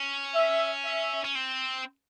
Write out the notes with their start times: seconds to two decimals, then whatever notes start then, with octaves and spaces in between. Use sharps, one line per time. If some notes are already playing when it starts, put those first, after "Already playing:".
Already playing: C#4
0.34 E5
0.85 E5
1.24 C#4
1.35 C4